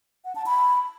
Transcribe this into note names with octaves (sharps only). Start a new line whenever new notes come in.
F#5
A5
B5